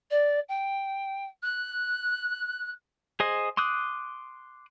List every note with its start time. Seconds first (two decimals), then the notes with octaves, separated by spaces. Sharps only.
0.11 D5
0.49 G5
1.43 F#6
3.20 G#4 C5 D#5
3.57 C6 D6 D#6 F#6